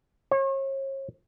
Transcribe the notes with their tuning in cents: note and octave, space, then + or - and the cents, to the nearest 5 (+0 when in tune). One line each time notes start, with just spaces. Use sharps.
C#5 -40